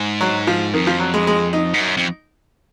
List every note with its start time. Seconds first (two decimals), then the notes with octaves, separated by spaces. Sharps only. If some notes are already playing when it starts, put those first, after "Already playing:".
Already playing: G#2
0.21 F#3
0.47 F3
0.74 F2 D#3
0.87 F3
1.00 F#3
1.14 G#3
1.27 G#3
1.53 D#4
1.74 G#2
1.80 F#2
1.97 F2